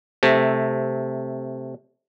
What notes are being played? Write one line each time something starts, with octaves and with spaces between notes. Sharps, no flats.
C3 A3